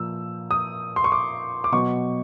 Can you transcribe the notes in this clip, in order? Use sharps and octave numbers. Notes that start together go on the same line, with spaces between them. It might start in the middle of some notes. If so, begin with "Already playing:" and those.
Already playing: A#2 F3 E6
D#6
C6
C#6
D6
D6
B2 F#3 C#6